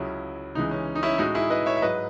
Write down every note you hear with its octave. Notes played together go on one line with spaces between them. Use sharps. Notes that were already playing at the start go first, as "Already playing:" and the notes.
Already playing: C#2 C#3 F#3 C#4 E4
C#2 C#3 E3 G#3 D#4
C#4
D#4
C#4 E4
A2 G#3 D#4 F#4
E4 G#4
B4 D#5
C#5 E5
E5
G#2 F#3 B4 D#5